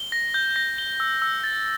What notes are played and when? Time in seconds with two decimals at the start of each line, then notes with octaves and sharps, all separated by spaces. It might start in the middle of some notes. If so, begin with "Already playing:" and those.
Already playing: G7
0.12 A#6
0.34 G6
0.56 A#6
0.78 G7
1.00 E6
1.22 E6
1.44 A6